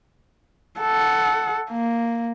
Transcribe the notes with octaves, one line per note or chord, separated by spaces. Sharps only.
A4 F#5
A#3